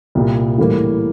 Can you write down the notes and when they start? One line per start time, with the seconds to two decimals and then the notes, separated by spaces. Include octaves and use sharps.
0.15 C2 A#2 G3
0.58 A2 E3 G3 A#3